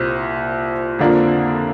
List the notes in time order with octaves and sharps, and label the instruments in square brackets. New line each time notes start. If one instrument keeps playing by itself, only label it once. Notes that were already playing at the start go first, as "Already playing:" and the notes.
Already playing: [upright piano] C2 A#2 C4
F2 D3 F3 A#3 D4